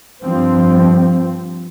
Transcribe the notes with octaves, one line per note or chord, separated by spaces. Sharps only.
G2 F3 C4